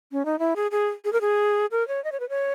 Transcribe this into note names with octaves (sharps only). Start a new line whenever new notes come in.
C#4
D#4
E4
G#4
G#4
G#4
A#4
G#4
A#4
C#5
D#5
C#5
B4
C#5